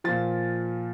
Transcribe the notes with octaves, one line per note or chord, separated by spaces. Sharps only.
A#2 F3 A6